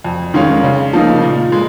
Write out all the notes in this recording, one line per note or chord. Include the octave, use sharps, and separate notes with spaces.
F2
D#3 G#3 C#4 F4
C#3
F3 A#3 D#4
A#2
G#3